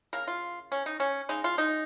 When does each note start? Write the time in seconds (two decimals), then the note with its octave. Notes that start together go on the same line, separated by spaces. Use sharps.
0.13 C#3 A#3 A#4
0.27 F4
0.72 C#4
0.86 D#4
1.00 C#4
1.29 C#3 G#3 D#4
1.44 F4
1.58 D#4